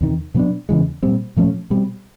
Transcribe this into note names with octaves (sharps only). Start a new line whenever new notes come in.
E2 C3 D#3
B2 F#3 B3 D4
E2 C#3 E3 G#3
A#2 G3 C4
A#2 F3 A3 C#4
B2 G3 C4